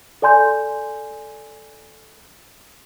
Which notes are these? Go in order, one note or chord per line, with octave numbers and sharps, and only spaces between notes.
A4 D5 G#5 C6 G6